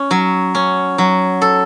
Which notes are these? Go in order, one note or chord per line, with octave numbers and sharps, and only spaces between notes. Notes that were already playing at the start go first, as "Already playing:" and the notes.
Already playing: C#4
F#3
C#4
F#3
A4